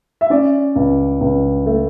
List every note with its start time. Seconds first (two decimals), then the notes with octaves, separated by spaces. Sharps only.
0.21 E5
0.30 C#4 D5
0.76 C#2
1.21 C#2
1.66 A3